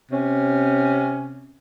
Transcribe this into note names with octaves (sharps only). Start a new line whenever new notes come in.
C3 C#4